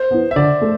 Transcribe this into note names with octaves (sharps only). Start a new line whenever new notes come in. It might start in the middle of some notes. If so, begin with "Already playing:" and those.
Already playing: C5
B3 E4
E5
D3 D5
A3